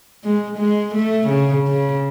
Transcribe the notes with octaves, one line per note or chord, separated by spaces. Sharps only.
G#3
G#3
A3
C#3
C#3